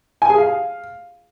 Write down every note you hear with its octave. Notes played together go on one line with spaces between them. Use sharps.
G#5
G#4
F5